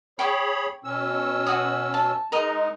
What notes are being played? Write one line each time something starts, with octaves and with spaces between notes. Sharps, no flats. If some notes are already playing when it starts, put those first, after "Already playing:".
G#4 C#5 G5 B5 C#6 D6
B2 C#4 E6
F#4 C#5 D#6
A5
G#3 D#4 A#4 D#5 A#5